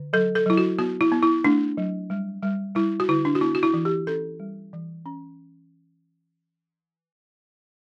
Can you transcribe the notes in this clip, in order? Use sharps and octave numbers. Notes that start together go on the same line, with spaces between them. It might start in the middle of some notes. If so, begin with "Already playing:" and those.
Already playing: D3
F#3 A4
A4
F#3 E4
F#4
B3 F#4
E4
B3
E4
A3 D4
F#3
G3
G3
G3 E4
F#4
D3 E4
D4
F#4
B3 E4
F#4
E4
E3
G4
C#4 A4
G3
E3
C#4